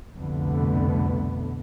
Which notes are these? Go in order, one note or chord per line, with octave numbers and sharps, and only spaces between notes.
C2 F2 B2 D3 A3 B3